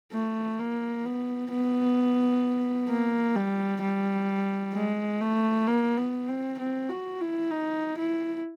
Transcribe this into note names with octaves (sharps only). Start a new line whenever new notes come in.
A3
A#3
B3
B3
A#3
G3
G3
G#3
A3
A#3
B3
C4
C4
F#4
E4
D#4
E4